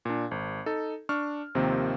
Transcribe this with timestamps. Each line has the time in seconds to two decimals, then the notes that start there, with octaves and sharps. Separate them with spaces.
0.05 A#2 D4
0.31 G#1
0.66 D#4 A4
1.09 D4 C#6 F6
1.55 D#2 C3 D#3 F3 A#3 C4